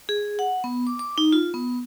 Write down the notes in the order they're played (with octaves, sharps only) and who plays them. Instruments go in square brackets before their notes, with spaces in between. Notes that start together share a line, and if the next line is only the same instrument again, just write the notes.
[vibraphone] G#4
F#5
B3
D6
D6
D#4
F4
B3